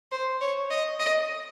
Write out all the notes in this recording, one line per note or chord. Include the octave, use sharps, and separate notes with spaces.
C5
C#5
D#5
D#5